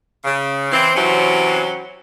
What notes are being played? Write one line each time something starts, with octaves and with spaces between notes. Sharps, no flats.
C#3
E3 C4
C3 E3 F#3 C4 C#4